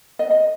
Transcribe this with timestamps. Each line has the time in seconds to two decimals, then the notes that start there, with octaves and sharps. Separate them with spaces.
0.19 D#5
0.31 D#5